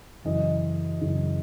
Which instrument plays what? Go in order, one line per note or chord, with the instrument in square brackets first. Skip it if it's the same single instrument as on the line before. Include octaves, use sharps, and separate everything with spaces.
[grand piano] F#2 C#3 E3 D#5
F#2 C#3 E3